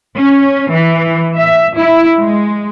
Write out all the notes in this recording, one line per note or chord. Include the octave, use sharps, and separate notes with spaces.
C#4
E3
E5
E4
G#3